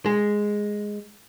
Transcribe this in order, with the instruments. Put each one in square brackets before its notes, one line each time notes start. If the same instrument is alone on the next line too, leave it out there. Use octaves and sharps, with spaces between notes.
[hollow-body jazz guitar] G#3